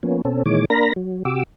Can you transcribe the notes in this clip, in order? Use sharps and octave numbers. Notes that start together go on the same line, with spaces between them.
F3 A#3 B3 C#4
B2 C4 C#4 A4
A#2 D#3 E3 G#3 C#5 D6
A#3 D4 A#4 A#5 B5 A#6
F#3
C3 F#4 G4 D6 E6